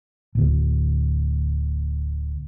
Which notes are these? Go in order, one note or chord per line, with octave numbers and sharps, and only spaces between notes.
D1 D2